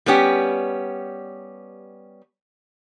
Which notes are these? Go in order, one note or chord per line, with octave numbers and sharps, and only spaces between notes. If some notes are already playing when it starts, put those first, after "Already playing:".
G3 B3 C#4 G4